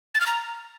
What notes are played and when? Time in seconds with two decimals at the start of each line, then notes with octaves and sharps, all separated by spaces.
0.15 A6
0.20 F6
0.26 A#5